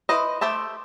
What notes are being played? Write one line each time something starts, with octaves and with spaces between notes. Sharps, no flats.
E4 B4 C5 D#5
A3 G4 C5 E5 A5